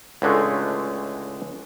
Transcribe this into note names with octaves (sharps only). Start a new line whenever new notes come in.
C#2 A2 D3 G#3 A3